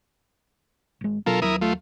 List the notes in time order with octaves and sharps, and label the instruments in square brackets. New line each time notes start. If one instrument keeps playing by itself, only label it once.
[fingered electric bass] G#1 G#3
[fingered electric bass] B2 F#3 D4 [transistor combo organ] F4 A4 A#4
[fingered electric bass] D#2 F#3 [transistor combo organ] E4 A#4 D#6
[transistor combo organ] A3 F4